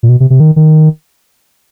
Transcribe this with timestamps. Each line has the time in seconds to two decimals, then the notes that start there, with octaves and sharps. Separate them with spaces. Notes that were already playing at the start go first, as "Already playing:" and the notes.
0.03 A#2
0.09 B2
0.20 C3
0.30 C3
0.40 D#3
0.56 D#3